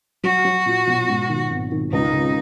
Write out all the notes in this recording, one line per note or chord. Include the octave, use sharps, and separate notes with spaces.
F#3 F#4
F#3
A#2
B1
G#2
D#3
G#1
D#3
C#2 D#4
C#3